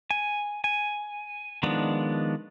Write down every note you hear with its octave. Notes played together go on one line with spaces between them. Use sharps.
G#5
G#5
D#3 F3 G#3 B3 D4